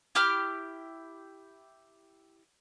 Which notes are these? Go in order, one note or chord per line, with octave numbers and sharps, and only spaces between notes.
E4 G4 D6 F6